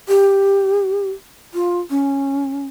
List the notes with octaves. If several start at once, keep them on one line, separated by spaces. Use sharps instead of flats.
G4
F4
C#4